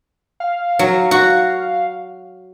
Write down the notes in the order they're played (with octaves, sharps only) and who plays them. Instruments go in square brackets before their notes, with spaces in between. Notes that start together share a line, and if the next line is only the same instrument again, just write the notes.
[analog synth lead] F5
[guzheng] F#3
F#4